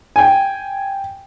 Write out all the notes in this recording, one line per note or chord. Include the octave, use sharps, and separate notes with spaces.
G5 G#5